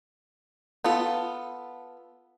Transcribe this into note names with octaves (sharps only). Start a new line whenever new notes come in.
B3 F4 A4